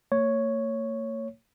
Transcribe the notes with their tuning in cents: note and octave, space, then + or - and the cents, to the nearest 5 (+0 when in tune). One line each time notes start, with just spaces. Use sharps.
A#3 -45 C#5 +0